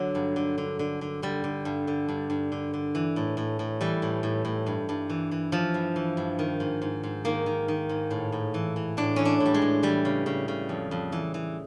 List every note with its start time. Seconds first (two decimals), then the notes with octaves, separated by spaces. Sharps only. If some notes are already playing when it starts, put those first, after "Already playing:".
Already playing: D3 F#3
0.15 G2
0.36 D3
0.58 D3
0.79 D3
1.01 D3
1.22 D3 G3
1.44 D3
1.65 G2
1.87 D3
2.08 G2
2.30 G2
2.52 D3
2.74 D3
2.95 E3
3.16 A2
3.37 A2
3.59 A2
3.81 E3 G3
4.02 A2
4.23 A2
4.45 A2
4.66 G2
4.89 G2
5.10 E3
5.31 E3
5.52 E3 F3
5.74 G2
5.96 E3
6.17 G2
6.39 D#3
6.60 G#2
6.82 G#2
7.03 G#2
7.25 D#3 A#3
7.46 D#3
7.68 D#3
7.89 G#2
8.11 A2
8.32 A2
8.54 E3
8.76 E3
8.97 A2 D4
9.16 E3 C#4
9.25 D4
9.40 A2
9.46 G3
9.54 G#3
9.62 A2
9.83 E3 G3
10.05 C#3
10.26 C#3
10.48 C#3
10.69 F2
10.91 F2
11.12 E3
11.34 E3